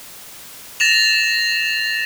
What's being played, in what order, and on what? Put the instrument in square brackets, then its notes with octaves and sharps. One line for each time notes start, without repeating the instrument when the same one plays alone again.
[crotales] A6 A#6 E7 F7